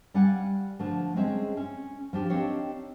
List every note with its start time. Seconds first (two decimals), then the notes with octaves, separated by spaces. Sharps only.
0.14 G3 D5 F5 F#5 G#5
0.79 D3 F3 A3
1.16 G#3 C4 C#4 G#4 E5
1.57 C#4
2.13 F3 D4 G4
2.30 C4 D4 D#4 G4 C#5 F5